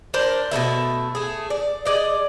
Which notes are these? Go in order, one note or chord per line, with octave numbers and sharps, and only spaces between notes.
D4 A#4 C5
B2 A3 A#3 E5
A3 G#4
D5
G#4 D5 D#5